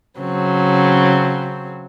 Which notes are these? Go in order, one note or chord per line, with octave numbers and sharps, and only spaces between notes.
C#3 F#3 C4